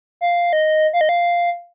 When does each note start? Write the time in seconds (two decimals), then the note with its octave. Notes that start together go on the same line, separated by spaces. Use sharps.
0.21 F5
0.53 D#5
0.93 F5
1.01 D#5
1.09 F5